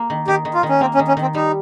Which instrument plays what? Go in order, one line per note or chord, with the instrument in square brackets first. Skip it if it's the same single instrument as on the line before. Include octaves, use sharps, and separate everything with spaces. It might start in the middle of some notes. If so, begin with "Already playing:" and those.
Already playing: [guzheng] A#3
D#3
[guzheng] D#3 [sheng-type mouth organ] G4
[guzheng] D#3
[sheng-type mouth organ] F4
[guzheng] D#3
[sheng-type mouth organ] C#4
[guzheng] A#3 [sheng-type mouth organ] C4
[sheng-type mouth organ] C#4
[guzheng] D#3
[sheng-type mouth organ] C#4
[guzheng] D#3 [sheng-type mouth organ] C4
[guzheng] G3 [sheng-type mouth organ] D#4